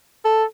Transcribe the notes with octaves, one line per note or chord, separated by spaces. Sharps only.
A4